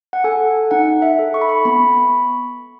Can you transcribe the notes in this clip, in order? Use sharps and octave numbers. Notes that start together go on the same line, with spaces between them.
F#5
A4 G#5
D#4 F#5
E5
A4
C#6
B5
C#6
B3 B5